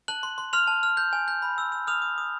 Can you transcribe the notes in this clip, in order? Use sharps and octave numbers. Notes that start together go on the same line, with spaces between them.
A5 F#6 F#7
C6
C6
C6 F6 F7
A5
F6
G6
G#5
G6
B5
E6
E6
D#6 F6 F7
D#6
D#6